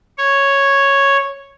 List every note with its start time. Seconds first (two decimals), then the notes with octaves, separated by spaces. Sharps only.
0.18 C#5